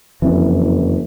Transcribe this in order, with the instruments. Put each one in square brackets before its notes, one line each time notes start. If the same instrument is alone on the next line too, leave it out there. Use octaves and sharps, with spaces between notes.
[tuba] F#1 [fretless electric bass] F2 E3